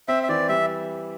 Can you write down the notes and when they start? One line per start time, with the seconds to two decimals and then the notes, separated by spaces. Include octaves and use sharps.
0.08 C4 E5
0.23 E5
0.29 E3 D5
0.49 G3 E5